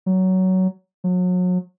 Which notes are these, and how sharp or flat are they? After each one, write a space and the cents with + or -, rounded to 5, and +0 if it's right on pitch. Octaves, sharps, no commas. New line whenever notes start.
F#3 +15
F#3 -35